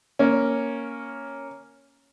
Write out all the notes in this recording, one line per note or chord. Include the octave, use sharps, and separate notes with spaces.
A#3 C#4